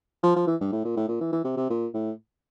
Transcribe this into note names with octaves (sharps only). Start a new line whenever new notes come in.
F3
F3
E3
G2
A2
A#2
A2
A#2
E3
E3
C3
C3
A#2
A2